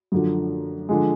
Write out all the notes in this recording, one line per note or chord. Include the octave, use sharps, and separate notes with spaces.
F#2 D3 F3
D3 F3 G#3